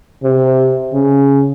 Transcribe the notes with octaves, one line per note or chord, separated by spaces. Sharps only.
C3
C#3